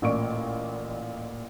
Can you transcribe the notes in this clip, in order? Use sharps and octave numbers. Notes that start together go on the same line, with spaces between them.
A1 A#2 D5 C#6 D7